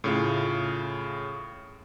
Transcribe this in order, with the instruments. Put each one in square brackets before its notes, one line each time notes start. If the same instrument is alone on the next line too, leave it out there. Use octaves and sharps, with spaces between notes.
[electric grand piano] A2 C#3 F4